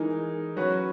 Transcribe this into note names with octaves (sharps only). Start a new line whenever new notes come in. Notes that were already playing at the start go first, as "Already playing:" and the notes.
Already playing: E3 G#3 D#4 A#4
F#3 C#4 F#4 B4